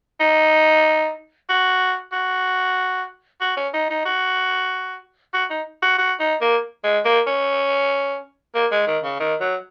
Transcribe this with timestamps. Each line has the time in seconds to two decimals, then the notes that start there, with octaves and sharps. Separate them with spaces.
0.20 D#4
1.49 F#4
2.12 F#4
3.41 F#4
3.57 C#4
3.74 D#4
3.90 D#4
4.05 F#4
5.33 F#4
5.50 D#4
5.82 F#4
5.98 F#4
6.20 D#4
6.41 A#3
6.84 G#3
7.05 A#3
7.27 C#4
8.55 A#3
8.71 G#3
8.87 D#3
9.03 C#3
9.19 D#3
9.40 F#3